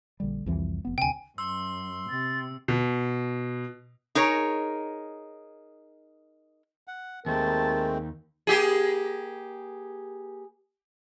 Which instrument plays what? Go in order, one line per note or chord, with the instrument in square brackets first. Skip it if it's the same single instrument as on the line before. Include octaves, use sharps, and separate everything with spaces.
[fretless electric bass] A#1 D3 G3
C2 F2 E3
F1 B3
[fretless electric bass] D2 C3 [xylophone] G5 G#5
[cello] F#2 [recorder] C6 [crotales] E6
[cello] C3 [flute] A6
[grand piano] B2
[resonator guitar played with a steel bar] D#4 G#4 A#4 C#5
[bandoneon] F#5
[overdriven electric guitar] D#2 [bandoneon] G#3 A3 C4 [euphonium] A#4 [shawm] A5
[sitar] A#3 G4 G#4